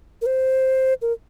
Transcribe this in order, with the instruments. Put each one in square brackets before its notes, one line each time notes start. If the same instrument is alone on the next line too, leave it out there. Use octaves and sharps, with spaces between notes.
[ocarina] A#4
C5
A#4